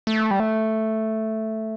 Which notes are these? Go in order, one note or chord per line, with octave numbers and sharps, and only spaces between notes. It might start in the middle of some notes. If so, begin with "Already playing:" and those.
A3
G3
A3